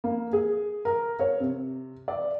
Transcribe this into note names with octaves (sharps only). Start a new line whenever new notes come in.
A#3
G#4
A#4
C#5
C3
D5